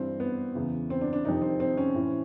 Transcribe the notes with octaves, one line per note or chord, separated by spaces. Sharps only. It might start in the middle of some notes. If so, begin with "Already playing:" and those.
Already playing: G2 E3 C4
B3
E2 C#3 E3
C4
D4
D4
F2 C3 D#3 D#4
C4
C4
C#4
A2 E3